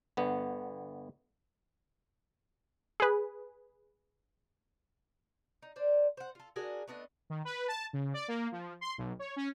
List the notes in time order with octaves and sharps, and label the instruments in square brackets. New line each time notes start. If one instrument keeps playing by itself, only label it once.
[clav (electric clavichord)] G1 D3 B3
[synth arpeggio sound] G#4 B4
[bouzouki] D#4
D4 C5 D5
C5 F#5
F4 A4
D4 F#4 G#4 A#4
A3 B3 D4 D#5
[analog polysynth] D#3
B4
A5
C#3
D5
A#3
F3
C6
B1
C#5
C#4